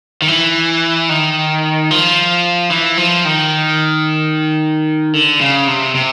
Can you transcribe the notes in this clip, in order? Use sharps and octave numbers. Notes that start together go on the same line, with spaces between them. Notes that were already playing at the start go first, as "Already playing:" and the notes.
D#3
E3
D#3
F3
E3
F3
D#3
D3
C#3
C3
C3